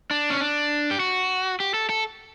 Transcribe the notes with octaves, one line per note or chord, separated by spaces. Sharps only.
D4
C#4
D4
G4
F#4
G4
A4
A4